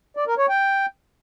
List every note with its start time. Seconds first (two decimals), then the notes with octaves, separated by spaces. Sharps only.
0.17 D5
0.27 A#4
0.38 C#5
0.49 G5